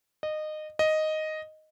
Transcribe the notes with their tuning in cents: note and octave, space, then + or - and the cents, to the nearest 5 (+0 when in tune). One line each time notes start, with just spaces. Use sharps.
D#5 -20
D#5 +0